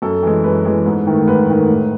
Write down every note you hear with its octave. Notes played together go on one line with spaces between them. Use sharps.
F#2 A4
E3 G#3
F#2 B4
E3 G#3
G#2
D#3 A3
G#2 B4
D#3 A3
A2